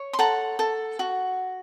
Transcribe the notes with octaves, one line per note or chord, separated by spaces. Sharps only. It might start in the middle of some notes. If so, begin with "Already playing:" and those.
Already playing: C#5
C6
A4 F#5 A#5
A4
F#4